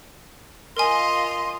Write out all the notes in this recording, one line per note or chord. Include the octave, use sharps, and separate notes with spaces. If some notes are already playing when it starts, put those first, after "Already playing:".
F4 A#4 D#5 G#5 C6